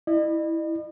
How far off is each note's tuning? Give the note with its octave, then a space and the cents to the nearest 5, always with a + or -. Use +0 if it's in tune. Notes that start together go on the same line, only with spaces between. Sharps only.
E4 -10 D#5 -45